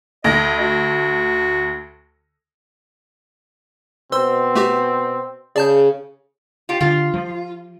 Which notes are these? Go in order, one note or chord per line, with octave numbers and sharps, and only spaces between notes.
D2 D#5 A#6
F#4
B2 C4 C5 C6 E6
A3 F#4 G4
C#3 G#4 D5 A5 G6
F4 G4
D3 F4
F3